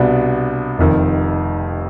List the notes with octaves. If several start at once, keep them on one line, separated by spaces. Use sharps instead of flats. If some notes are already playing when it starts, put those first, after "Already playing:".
Already playing: C2 B2 G3 B3 D4
F1 F2 D#3